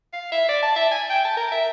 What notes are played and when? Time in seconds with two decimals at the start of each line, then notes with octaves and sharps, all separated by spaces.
0.13 F5
0.32 E5
0.49 D5
0.63 A5
0.76 E5
0.91 G#5
1.10 G5
1.25 A5
1.37 A#4
1.52 E5